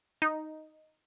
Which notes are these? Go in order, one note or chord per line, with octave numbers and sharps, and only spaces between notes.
D#4